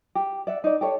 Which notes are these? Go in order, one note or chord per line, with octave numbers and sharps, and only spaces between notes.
G4
D5 E5 F#5
D#4 D5
G4 A4 C#5